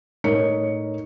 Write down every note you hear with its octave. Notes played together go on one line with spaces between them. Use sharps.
A2 D#4 A#4 C#5 C#7